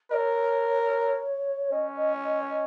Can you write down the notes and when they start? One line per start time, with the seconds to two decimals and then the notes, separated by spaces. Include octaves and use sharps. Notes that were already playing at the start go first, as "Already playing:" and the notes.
0.11 A#4 C#5 D#5
1.72 C#4 D#5
1.97 D#5
2.24 D#5
2.50 D#5